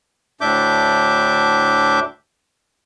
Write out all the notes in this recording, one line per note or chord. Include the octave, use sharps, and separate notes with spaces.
D2 A2 D4 E5 D6 G6